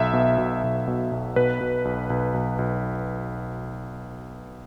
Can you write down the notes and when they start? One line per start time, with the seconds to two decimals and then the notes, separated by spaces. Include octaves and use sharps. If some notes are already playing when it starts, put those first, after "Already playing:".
Already playing: B1 E5
0.13 B2
0.38 B2
0.64 B1
0.87 B2
1.12 B1
1.36 B2 B4
1.61 B2
1.85 B1
2.10 B1
2.34 B1
2.59 B1